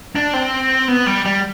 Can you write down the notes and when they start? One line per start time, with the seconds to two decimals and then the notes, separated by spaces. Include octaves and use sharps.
0.15 D4
0.33 C4
0.88 B3
1.06 G3
1.25 G3